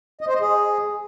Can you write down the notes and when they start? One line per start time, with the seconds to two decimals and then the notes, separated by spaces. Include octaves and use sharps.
0.21 D#5
0.28 C5
0.34 D#5
0.41 G#4